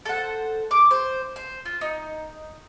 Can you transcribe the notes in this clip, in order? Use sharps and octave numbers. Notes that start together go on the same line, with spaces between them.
A4 C5 F#5
D6
C5
C5
F4
D#4